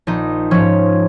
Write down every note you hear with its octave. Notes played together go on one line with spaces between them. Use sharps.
A#1 D#4
G#2 F3 C#4